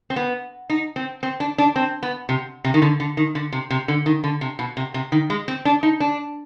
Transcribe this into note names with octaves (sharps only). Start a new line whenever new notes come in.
C4
B3
D#4
C4
C4
D4
D4
C4
B3
C3
C3
D#3
D3
D3
D#3
D3
C3
C3
D3
D#3
D3
C3
B2
C3
C3
D#3
G#3
C4
D4
D#4
D4